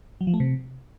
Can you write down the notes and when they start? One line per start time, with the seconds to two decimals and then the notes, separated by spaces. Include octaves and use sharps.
0.21 F#3
0.27 F3
0.34 A3
0.40 C3